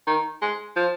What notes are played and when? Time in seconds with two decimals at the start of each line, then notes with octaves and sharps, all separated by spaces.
0.07 D#3
0.42 G#3
0.76 F3